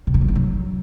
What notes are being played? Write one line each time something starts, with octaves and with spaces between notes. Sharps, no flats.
C3
F3
D3
E3
F#3